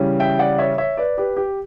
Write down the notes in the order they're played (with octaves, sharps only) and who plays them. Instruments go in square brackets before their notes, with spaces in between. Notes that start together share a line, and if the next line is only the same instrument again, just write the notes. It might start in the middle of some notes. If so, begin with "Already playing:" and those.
Already playing: [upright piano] C#3 E3 G3 C#4
E5 G5
D5 F#5
C#5 E5
C#5 E5
B4 D5
G4 B4
G4